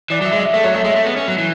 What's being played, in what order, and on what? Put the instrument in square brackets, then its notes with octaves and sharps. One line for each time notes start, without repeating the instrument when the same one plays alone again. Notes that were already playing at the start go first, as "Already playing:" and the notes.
[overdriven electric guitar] E3 [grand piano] D5
[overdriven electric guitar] F#3 [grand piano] E5
[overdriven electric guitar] G#3
[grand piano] E5
[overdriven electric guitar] A3 [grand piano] E5
[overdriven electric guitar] F#3 [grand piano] C#5
[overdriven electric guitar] A3 [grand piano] E5
[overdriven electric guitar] G#3 [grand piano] E5
[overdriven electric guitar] A3
B3
C#4
F#3
E3